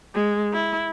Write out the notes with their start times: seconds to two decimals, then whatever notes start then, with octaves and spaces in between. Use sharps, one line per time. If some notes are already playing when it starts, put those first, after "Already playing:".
0.15 G#3
0.53 E4